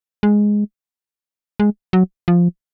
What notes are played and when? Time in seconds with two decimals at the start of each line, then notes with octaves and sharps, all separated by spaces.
0.23 G#3
1.60 G#3
1.93 F#3
2.28 F3